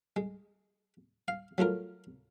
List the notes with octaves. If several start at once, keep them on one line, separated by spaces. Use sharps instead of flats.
G#3
F5
F#3 A3 F4 A#4